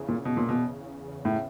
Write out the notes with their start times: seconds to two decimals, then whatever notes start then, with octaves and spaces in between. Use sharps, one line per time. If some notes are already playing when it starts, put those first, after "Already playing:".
Already playing: E2 C#3
0.08 A#2
0.25 B2
0.37 A#2
0.49 B2
1.25 A2